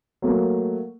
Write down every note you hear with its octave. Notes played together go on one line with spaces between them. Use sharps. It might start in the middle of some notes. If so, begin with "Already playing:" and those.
F#3 A3 A#3